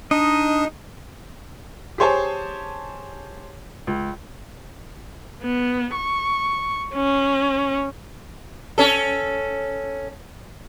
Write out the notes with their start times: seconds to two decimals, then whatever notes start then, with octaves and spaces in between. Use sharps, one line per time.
0.11 D4 D#4 D#5
1.98 G4 G#4 C5 C#5 G#5 A5
3.87 C#2
5.42 B3
5.94 C#6
6.94 C#4
8.78 C#4 A4